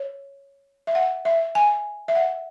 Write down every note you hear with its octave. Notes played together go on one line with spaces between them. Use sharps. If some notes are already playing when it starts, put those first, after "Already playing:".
Already playing: C#5
E5
F#5
E5
G#5
E5
F#5